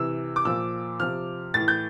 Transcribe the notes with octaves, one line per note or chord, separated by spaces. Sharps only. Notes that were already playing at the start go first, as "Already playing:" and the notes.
Already playing: C3 E3 E6
D6
A#2 F3 E6
C3 F3 F6
A2 E3 A6
G6